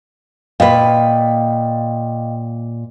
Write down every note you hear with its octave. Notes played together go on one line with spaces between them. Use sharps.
A#2 B4 D#5 F5 G5